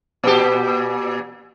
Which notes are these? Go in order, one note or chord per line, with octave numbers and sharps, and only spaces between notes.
A#2 G4